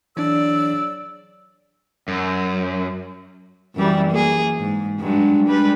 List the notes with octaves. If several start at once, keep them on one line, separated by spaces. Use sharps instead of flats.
C#3 E3 F#3 D4 D5 E6
F#2
F#2 E3 G3
A#3 G#4
G#2
G2 F#3 G#3
G3 G#3 B4